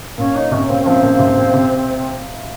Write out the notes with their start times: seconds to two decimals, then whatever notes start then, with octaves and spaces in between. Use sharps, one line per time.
0.17 A#2 C#4
0.35 D#4
0.51 C3 C#4
0.68 A#2 C#3 C4
0.82 C#4
0.85 C#3 F3 C4
1.02 A#2 C#3
1.19 C3
1.36 A#2
1.54 C3